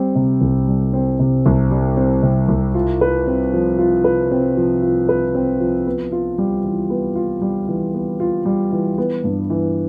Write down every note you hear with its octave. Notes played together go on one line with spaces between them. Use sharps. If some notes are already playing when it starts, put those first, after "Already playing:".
Already playing: G3 C4
C3
C2
G3
C4
C3
C2
G3
C4
C3
C2
F4
B4
C4
F3
F4
B4
C4
F3
F4
B4
C4
F3
B3
F4
G3
E3
B3
F4
G3
E3
B3
F4
G3
E3
B3
G2
E3